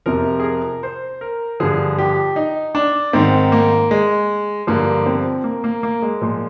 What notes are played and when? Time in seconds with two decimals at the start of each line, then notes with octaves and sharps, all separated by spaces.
0.06 F2 C3 F3 A#4
0.40 G#4
0.44 A#4
0.83 C5
1.21 A#4
1.60 G2 D3 F3 G#4
1.99 G4
2.36 D#4
2.75 D4
3.13 G#2 D#3 C4
3.52 A#3
3.91 G#3
4.67 G2 D3 F3 A#3
5.06 C4
5.44 A#3
5.64 A#3
5.83 A#3
6.02 G#3
6.21 A#2 F3